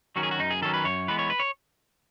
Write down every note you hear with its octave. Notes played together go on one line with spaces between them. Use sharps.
D#3 F#3 C#4 F#4
G#4
F#4
F#2 D#4
G#4
D#3 F#3 C#4 A4
B4
F#2 C#5
E3 G#3 B3 B4
C#5
B4
C#5